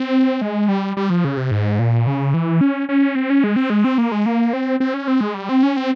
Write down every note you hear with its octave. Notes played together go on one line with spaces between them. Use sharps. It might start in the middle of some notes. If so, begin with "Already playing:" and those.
Already playing: C4
G#3
G3
G3
F3
C#3
C3
G#2
A#2
C#3
E3
C#4
C#4
C4
C#4
G#3
C4
G#3
C4
A#3
G#3
A#3
C4
C4
C#4
C4
G#3
G3
C4
C#4
C4